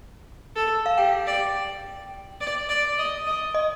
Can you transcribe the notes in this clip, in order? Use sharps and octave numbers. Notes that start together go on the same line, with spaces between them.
A4
F5
G4 G5
D5
D5
D5
D#5
D#5
D#5